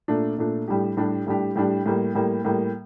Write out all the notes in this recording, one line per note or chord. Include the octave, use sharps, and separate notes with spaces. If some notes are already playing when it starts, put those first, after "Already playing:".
A#2 A3 D4
A#2 A3 D4
A2 G3 D4 G4
A2 G3 D4 G4
A2 G3 D4 G4
A2 G3 D4 G4
A2 G3 A#3
A2 G3 A#3
A2 G3 A#3